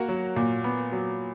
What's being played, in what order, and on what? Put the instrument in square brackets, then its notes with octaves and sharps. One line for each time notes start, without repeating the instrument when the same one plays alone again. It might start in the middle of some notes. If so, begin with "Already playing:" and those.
Already playing: [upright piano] A#3 F#4 A#4
F#3
A#2
B3
F#3